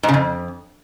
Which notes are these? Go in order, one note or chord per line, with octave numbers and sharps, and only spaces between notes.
G#2
C#3
F2